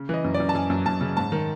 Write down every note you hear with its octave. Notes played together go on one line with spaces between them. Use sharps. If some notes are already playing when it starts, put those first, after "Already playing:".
Already playing: C#3
E3 D#5
F#2
D5
F#2
A5
F#2 G#5
F#2
F#2 A5
C#3
G#2 A5
D#3